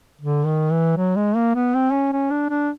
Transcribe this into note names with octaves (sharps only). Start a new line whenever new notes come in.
D3
D#3
E3
F#3
G#3
A#3
B3
C4
C#4
C#4
D4
D4